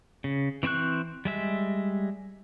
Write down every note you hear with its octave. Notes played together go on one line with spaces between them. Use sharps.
C#3
E3 C4 C5 C#6 F#6
G3 G#3 E5